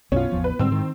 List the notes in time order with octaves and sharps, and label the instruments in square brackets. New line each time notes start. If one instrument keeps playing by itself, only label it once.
[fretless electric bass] B1 F#2 B2 [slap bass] B3 [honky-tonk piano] C#4 F4
[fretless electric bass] A1 E2 F3
[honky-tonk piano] B4
[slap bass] G#2 [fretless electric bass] D3 G3 [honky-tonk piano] C4 E6
[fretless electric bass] D#3